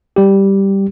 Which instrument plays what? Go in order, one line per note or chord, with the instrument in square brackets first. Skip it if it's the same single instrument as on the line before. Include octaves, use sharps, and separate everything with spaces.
[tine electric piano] G3 G4